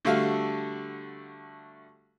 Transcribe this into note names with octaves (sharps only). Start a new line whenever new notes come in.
D3 G3 A3 F#4 A4 F5